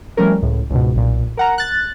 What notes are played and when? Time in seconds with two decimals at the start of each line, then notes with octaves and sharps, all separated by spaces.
0.17 F3 G3 A3 C#4 A#4
0.42 C#2 A2
0.71 C#2 G#2 B2
0.95 B1 A#2
1.37 A#4 F#5 A#5
1.58 F#6 A6